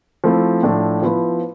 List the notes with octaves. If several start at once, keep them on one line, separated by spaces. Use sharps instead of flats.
F3 A3 C4 E4
A2 F3 A3 D4
F3 B3 E4 B4